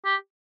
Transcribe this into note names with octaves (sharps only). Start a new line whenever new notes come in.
G4